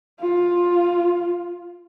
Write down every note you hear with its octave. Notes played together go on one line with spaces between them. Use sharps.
F4